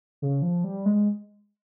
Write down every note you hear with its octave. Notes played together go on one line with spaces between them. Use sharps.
C#3
F3
G3
G#3